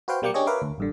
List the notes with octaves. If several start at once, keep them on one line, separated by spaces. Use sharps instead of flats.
F#4 B4 C5 F5 G5
B2 G3 A#3 G5 D6 C#7
C#4 D4 G4 G#4 C#5 D#5
A#4 B4 C#5 E5 F5 D6
D2
A1 G2 D3